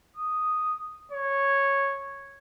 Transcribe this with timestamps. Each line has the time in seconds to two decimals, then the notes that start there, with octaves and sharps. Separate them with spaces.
0.16 D#6
1.12 C#5